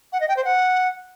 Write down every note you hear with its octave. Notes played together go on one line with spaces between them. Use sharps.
F#5
D#5
G5
C5
F#5